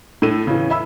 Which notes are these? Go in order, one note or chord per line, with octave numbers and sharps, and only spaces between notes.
A2 A4 D#7
C#3 E3
E5 B5 E6